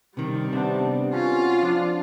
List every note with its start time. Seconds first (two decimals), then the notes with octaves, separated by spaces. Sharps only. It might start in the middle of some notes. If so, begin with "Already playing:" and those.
0.17 C3 D#3 G3
0.53 C3 B3 C4 D4
1.13 C#4 F4 F#4
1.62 F3 D4